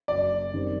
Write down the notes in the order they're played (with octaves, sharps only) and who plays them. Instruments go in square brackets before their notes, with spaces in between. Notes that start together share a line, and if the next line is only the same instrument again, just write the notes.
[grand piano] F#1 F#2 F#3 [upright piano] D5
[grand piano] F#2 D#3 G3 C4